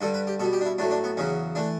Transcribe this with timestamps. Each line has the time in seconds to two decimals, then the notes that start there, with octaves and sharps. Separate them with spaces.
0.01 G2 D3 G3 A4
0.14 B4
0.27 G4
0.40 B2 G3 A4
0.53 G4
0.61 D4
0.66 E4
0.78 A2 F#3 A3 D4
0.91 D4
1.04 B3
1.17 E2 C#3 F#3 C#4
1.55 E3 A3 D4